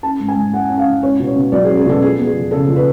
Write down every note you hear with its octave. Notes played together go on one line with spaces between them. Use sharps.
C#4 A5
G#2
G#5
G#2
G#3 F#5
C#4
F5
G#2
C#4 C#5
B2
C#5
B2
F#3 D5
G#4
C#4
G#4
B2 A4
F3 G#4
B3
G#4
F2
C#3 A4
F3
B4